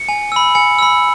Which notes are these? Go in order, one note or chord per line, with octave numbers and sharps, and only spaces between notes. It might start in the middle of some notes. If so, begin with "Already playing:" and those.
Already playing: C#7
G#5
B5 E6
G#5 C#7
B5 E6